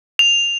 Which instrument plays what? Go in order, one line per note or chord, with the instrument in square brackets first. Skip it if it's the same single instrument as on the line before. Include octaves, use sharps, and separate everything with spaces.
[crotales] F7